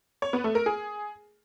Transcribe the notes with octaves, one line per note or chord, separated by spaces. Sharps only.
C#5
B3
A3
A#4
G#4